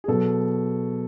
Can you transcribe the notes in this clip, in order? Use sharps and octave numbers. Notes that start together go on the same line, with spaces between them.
G#4
B2 F#3 A4